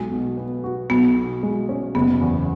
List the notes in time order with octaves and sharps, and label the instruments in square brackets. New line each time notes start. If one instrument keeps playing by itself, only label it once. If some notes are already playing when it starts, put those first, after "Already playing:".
Already playing: [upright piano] B1 [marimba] G#3
[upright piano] B2
B3
F#4
[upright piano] B1 [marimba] B3
[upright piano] B2
G#3
C#4
[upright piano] F#1 [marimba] B3
[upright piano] E2